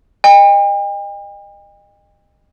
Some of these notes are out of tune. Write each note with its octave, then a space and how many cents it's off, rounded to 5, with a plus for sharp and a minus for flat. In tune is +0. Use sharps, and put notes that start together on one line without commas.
D#5 -25 G5 +45